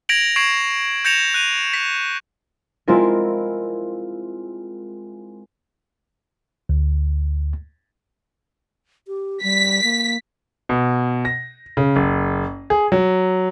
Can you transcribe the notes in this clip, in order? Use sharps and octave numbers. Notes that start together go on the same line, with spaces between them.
G#6 A#6 B6 D7 F7 F#7
C#6 G#6 C7 D7 E7 F#7
G6 G#6 A#6 C#7 E7 F7
F#6 D#7 F7
B6
G#3 C4 E4 F4 A#4
D2
G4
G3 B6
A#3
B2
A#6
C#3
F#1
G#4
F#3